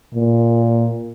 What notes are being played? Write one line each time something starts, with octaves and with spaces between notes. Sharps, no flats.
A#2